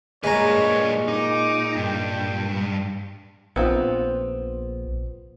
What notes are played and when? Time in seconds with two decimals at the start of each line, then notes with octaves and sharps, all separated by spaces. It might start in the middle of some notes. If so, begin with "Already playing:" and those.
0.24 A#2 G3 G#3 B4 C#5 A#5
1.08 D#4 D6
1.76 G2 G5
3.56 A#1 B3 C4 F4